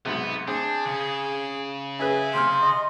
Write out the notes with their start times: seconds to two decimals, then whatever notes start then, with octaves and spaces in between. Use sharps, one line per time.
0.05 B1 G#2 C3 B3
0.48 C4 D4 G#4
0.86 C#3
1.99 C#4 G#4 B4 E5 G#5
2.34 C3 C4 C6 F6
2.62 D#5